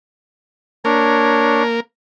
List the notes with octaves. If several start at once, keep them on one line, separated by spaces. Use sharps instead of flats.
A#3 D4 A#4 C#5